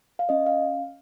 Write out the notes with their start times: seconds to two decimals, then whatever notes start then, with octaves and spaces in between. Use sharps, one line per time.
0.19 F5
0.29 C#4 D#5
0.46 F5